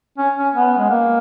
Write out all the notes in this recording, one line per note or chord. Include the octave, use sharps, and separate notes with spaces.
C#4
C#4
B3
G#3
A#3